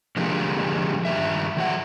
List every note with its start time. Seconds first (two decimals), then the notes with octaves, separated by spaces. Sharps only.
0.17 D3 F3 G#3 A#3 G4 A4
1.05 G2 D#3 E5
1.57 D#3 F#3 F#5